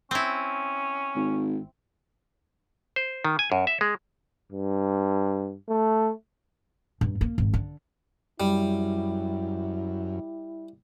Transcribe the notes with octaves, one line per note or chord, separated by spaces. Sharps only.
C4 C#4 E4
G#1
C5
D#3
G#5
F#2
E5
G#3
G2
A3
G2
A#3
G#1
D3
F#2 G3 E4